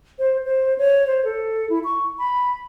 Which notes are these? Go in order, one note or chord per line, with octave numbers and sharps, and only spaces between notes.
C5
C5
C#5
C5
A4
E4
C#6
B5